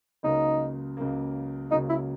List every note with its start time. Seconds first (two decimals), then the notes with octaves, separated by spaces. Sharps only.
0.23 C#2 C#3 F#3 A#3 D#4
0.97 C#2 C#3 F#3 A#3
1.70 C#2 C#3 F#3 A#3 D#4
1.89 E4